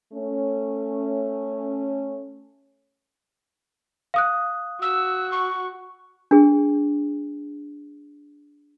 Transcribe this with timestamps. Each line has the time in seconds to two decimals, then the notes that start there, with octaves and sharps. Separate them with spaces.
0.13 A3 C#4
4.14 F5 D#6 F#6
4.82 F#4 E6
5.32 C#6
6.31 D4 G#4